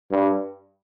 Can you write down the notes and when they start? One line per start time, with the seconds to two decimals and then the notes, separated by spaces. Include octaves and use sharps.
0.11 G2